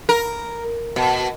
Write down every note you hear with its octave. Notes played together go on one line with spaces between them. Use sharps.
A#4
B2